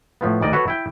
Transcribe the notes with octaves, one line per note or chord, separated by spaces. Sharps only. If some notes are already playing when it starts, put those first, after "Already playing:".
A2 F3 B3
D2 D#3 D5 D#5
F#4 A4 B4 C#5
E4 G5